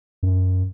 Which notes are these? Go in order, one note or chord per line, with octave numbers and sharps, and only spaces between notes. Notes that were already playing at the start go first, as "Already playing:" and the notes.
F#2